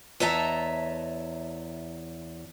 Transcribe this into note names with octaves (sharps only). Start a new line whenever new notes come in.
E2 C#5 D#5 E5 A5 A#5